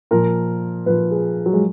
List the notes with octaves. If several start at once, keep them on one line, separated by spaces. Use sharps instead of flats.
A#2 F3 A#4
A#2 F3 B4
G#4
F#3
G#3